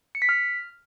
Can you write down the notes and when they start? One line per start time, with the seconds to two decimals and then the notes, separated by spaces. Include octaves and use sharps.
0.15 C#7
0.22 B6
0.29 F6